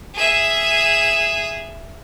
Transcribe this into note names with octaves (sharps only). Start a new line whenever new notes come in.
G#4 E5